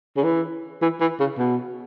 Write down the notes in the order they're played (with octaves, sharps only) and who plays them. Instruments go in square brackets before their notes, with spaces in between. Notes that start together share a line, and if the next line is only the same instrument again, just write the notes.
[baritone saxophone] C#3
E3
E3
E3
C#3
B2